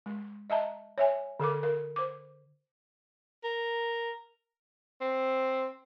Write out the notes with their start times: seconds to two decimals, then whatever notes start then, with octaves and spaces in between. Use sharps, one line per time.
0.06 G#3
0.50 D#5 E5 A5 A#5
0.98 C#5 E5 G#5
1.40 D3 A4 A#4 D6
1.63 A#4
1.96 C5 D6
3.44 A#4
5.01 C4